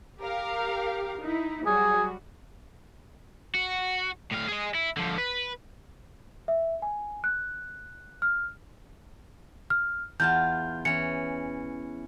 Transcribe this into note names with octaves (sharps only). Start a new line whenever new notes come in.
G4 A#4 F5
D#4 E4
F#3 G3 F#4 G#4
F#4
A2 F5
G#4 D#5
E4
D3 F3
B4
E5
G#5
F#6
F6
F6
E2 F4 A5 G6
E3 C#4 C#7